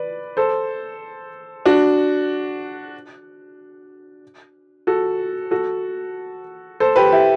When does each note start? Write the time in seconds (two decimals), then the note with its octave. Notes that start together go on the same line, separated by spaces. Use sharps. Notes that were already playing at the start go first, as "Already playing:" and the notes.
Already playing: B4 D5
0.37 A4 C5
1.66 D4 F#4
4.87 F#4 A4
5.51 F#4 A4
6.80 A4 C5
6.96 G4 B4
7.12 E4 G4